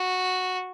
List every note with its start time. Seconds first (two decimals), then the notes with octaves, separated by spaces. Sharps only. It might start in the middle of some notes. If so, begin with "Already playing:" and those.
Already playing: F#4